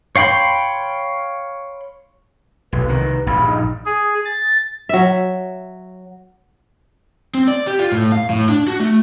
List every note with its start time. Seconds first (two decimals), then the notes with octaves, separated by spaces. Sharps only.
0.16 C#5 F5 G5 B5 C6
2.73 B1 B4
2.89 C2 D#3
3.27 A#1 G2 B5
3.47 D#4
3.85 G#4
4.25 A6
4.89 F#3 E5
7.35 C4
7.48 D5
7.67 G4
7.79 F4
7.92 A2
8.12 F5
8.30 A2
8.49 D4
8.67 F#4
8.80 A3